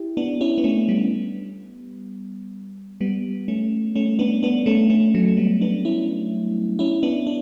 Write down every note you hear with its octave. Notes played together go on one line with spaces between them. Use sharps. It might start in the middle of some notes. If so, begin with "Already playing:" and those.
Already playing: E4 G4
B3 D4
C#4 E4
B3
A3 C#4
C#4
G3 B3
G3 B3
A3 C#4
A3 C#4
B3 D4
B3 D4
A3 C#4
A3 C#4
F#3 A3
G3 B3
B3 D4
C#4 E4
C#4 E4
B3 D4
D4